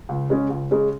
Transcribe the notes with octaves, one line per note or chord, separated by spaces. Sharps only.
C#2
C#3 G#3 C#4
C#2
C#3 G#3 C#4